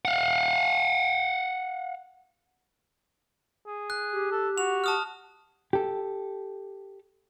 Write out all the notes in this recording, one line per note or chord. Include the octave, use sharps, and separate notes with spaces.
F5 F#5
G#4
F#6
G4
A4
F#4 F7
A5 D#6 F6
G4 A4